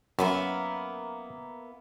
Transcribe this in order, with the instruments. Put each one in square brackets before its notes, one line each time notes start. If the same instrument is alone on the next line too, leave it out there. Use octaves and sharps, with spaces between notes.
[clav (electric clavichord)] F#2 [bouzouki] A#3 B3 E4